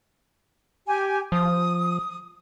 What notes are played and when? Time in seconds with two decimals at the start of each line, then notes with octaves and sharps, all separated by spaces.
0.87 G4 G#5
1.32 F3 D#6